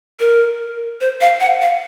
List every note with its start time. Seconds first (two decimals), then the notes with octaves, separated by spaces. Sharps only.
0.20 A#4
1.01 C5
1.21 F5
1.40 F#5
1.62 F5